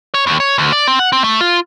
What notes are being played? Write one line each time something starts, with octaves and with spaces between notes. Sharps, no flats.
C#5
D#2
C#5
D2
D5
C4
F#5
C4
A3
F4